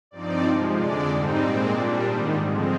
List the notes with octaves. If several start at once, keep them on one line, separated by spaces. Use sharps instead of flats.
G2 F3 C4 D#4 D5
C3 F3 G#3
F2 D3 G#3 D4 D5
G#2 G3 C4 D#4
A#2 G#3 C4 D5
A#2 G3 D4 D5
G#2 D#3 G3 C5 D#5
D3 F3 G#3 C4